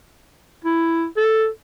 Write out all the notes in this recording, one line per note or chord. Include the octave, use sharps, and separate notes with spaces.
E4
A4